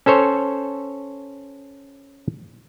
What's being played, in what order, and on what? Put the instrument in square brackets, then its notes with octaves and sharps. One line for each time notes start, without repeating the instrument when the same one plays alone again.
[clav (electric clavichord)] C#4 A4 C5 C#5